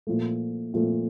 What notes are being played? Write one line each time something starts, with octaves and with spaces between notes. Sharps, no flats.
A#2 F3 A3
A#2 F3 A3